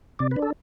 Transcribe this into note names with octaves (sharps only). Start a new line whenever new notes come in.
C3 D5
B4
D4
A4